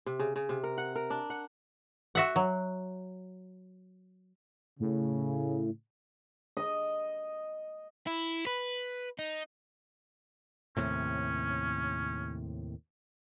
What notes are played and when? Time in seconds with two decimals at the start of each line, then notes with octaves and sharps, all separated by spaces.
0.06 C3
0.20 C#3
0.36 C#3
0.49 C3
0.64 A#4
0.78 F#5
0.96 A#4
1.10 D4
1.30 F#5
2.15 F#4 E5 F#5
2.36 F#3
4.80 A2 C#3
6.57 D#5
8.07 E4
8.47 B4
9.19 D#4
10.77 D#2 A2 C3 C#4